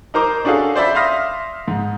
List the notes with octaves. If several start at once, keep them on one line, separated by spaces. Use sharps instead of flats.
D#4 A#4 C5 A#5 D6
C#4 D4 F#4 G#4 A4 F5
C5 D5 E5 B5
E5 F5 C6 D#6 F6 A#6
G#2